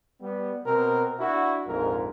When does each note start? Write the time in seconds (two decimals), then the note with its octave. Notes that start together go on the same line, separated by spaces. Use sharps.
0.21 G3 B3
0.66 B2 C4 A#4
1.19 D4 E4 F#4
1.67 A#1 F2 G#2 A#4